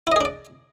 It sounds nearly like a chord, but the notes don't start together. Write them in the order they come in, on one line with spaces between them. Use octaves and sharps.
E4 D#5 G#4 D4 D5